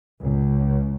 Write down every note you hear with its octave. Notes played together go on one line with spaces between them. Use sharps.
C#2